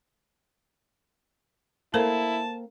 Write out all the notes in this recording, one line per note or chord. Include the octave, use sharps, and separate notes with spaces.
A#3 C4 E4 A4 A#4 C5 A5